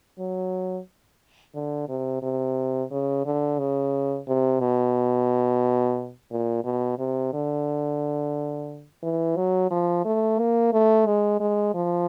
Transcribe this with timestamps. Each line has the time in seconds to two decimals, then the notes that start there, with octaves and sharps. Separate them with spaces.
0.19 F#3
1.54 D3
1.89 C3
2.22 C3
2.91 C#3
3.26 D3
3.59 C#3
4.28 C3
4.60 B2
6.31 A#2
6.64 B2
6.98 C3
7.33 D3
9.03 E3
9.36 F#3
9.71 F3
10.05 A3
10.39 A#3
10.73 A3
11.07 G#3
11.40 G#3
11.74 F3